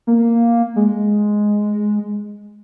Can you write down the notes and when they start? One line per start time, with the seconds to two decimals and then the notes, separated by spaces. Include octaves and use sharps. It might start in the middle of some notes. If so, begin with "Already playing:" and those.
0.07 A#3
0.76 G#3